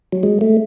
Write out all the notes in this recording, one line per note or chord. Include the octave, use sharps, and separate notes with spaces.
F#3
G#3
A3